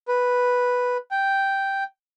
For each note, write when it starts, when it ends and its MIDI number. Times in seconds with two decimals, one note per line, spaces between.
0.08 0.97 71
1.11 1.84 79